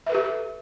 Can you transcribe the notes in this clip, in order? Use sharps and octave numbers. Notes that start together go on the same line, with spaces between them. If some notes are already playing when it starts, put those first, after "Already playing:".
G4 A4 B4 E5